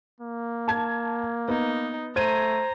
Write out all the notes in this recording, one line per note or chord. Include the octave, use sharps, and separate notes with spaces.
A#3
A5 G#6
B3 D#4
A3 C5 A#5 G#6 D#7